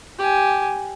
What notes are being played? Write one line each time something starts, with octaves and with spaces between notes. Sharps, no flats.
G4 G#5